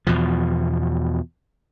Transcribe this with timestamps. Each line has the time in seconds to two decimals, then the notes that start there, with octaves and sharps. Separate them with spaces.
0.07 E2 B2 F3